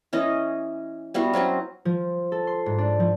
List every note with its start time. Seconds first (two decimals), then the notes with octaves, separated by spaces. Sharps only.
0.13 E3 C#4 D#5
1.14 G3 B3 E4 F#4
1.34 F#3 C4 C#4 F#4
1.85 F3
2.32 A4
2.47 C6
2.66 G#2
2.78 D4
3.00 F3